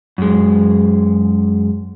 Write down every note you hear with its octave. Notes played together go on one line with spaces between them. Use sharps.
F#2 G#3